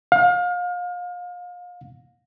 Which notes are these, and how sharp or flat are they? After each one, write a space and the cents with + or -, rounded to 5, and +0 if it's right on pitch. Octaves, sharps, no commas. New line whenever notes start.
F5 +35